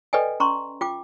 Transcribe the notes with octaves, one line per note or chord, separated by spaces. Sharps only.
A4 B4 D5 D#5 G5 G#5
C#4 A#5 C6 C#6
F4 G5 D6